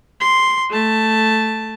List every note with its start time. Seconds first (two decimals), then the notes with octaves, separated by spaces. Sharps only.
0.21 C6
0.70 A3 A5